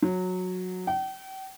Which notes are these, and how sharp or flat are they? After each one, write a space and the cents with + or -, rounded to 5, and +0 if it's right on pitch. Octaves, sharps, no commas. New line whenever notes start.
F#3 -15
G5 -40